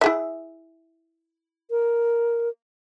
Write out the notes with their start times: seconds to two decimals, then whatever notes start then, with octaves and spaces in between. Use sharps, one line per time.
0.01 E4 G#4 E5
1.71 A#4